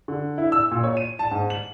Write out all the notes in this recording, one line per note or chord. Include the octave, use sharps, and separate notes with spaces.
D3
E4
E6
A#2
C#5
D#7
A5
G#2
F#7